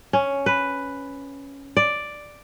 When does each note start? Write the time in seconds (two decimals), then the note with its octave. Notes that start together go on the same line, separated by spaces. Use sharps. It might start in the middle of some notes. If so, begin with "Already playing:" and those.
0.13 C#4
0.46 B4
1.77 D5